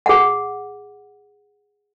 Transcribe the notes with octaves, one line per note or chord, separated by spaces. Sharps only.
G#4 F#5